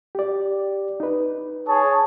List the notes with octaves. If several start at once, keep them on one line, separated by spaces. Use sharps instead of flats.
G4 D5
D#4 B4
G#4 C#5 A5